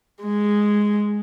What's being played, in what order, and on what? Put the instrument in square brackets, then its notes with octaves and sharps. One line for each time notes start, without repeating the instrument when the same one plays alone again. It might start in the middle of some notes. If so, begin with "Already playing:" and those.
[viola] G#3